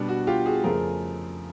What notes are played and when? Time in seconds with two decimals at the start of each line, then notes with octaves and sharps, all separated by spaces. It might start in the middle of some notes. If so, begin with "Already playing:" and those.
Already playing: B2 G3 B3 D4
0.09 F#4
0.27 F4 G4
0.46 F#4 G#4
0.64 F2 C#3 F3 A3 G#4 A#4